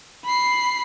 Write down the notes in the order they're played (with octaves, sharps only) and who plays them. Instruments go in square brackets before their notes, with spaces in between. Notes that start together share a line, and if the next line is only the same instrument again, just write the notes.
[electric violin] B5 C7